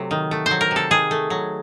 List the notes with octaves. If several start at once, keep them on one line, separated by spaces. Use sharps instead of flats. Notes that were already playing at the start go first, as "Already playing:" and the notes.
Already playing: C3 F#3 A3
D#3
A3
F#3 C5
A#4
C3
A4
D#3 G#4
A3
F#3